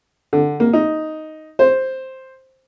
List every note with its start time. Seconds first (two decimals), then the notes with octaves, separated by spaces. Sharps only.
0.33 D3
0.60 A#3
0.73 D#4
1.59 C5